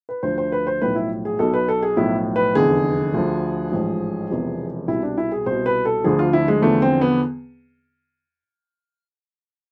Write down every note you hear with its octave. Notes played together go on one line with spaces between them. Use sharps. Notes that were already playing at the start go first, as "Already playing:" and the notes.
B4
D2 D3 F3 C5
C5
B4
C5
B1 A2 F3 B4
E4
G#4
B1 B2 A4
B4
A4
G#4
B1 A2 F3 E4
B4
F1 E2 D3 G#4
D2 D3 F3
A1 G#2 F3
E1 E2 C3 F3
C2 B2 E4
D4
E4
G#4
C2 B2 C5
B4
A4
D2 D3 F3 G#4
F4
E4
G#3
E2 D3 F3 A3
C4
B3